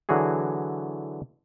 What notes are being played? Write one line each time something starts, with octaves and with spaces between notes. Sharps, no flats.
D3 E3 F#3 F#4 G#4